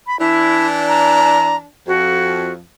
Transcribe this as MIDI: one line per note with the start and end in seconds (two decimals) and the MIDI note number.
0.07 0.19 83
0.20 1.66 52
0.20 1.66 62
0.20 0.67 64
0.88 1.56 82
1.87 2.60 41
1.87 2.52 66